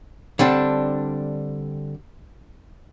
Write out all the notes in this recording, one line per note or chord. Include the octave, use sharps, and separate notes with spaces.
D3 G3 C4 D4